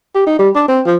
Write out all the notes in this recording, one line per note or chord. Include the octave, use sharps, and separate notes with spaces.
G4
D#4
G3
D4
C4
F3